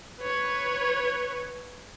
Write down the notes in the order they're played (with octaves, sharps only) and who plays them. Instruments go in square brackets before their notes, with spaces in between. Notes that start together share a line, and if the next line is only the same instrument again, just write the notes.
[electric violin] B4 C#5